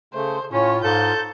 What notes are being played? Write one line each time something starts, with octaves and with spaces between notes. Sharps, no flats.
C#3 A3 C5
A2 C#4 F4 C#5
G#2 A4 G6